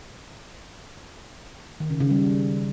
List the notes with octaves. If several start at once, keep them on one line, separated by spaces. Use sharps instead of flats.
D#3
C#3
C#3
G3